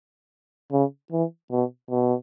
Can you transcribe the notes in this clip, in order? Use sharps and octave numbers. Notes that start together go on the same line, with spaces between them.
C#3
E3
B2
B2